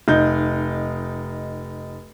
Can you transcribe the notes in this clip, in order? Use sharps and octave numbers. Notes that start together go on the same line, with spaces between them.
F1 D#4 G6